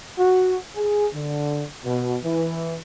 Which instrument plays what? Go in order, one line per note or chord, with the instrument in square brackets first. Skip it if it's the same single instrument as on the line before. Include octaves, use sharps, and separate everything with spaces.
[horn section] F#4
G#4
D3
B2
E3